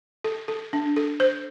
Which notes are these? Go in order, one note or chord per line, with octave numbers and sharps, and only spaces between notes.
A4
A4
D4
A4
C5